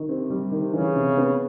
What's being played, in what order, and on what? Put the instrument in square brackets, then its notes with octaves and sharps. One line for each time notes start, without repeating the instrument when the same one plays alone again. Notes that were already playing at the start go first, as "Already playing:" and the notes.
Already playing: [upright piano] D#3
[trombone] C3 [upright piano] C4
[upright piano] G3
D#3
[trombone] C#3 [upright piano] E3
[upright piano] C3
B3